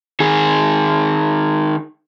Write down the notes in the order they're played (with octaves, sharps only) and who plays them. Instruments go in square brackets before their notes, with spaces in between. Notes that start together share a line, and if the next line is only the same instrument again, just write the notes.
[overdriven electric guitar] D#3 G#4